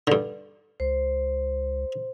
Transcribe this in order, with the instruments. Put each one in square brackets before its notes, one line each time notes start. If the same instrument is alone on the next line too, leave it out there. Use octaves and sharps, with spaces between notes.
[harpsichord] G2 D3
[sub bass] C#2 [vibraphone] C5